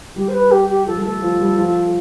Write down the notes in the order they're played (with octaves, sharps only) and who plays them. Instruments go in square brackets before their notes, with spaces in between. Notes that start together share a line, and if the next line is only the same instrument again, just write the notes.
[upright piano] G3 [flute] G4
[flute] C5
B4
G4
G4
[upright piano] F3 [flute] A4
[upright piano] G3
[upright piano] A3 [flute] A4
[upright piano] F3
G3
F3